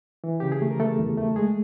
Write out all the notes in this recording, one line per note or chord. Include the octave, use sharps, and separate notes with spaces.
E3
C#3 G4
G#4
A3
A#4
A3 A4
E2
A3
G#3 G#4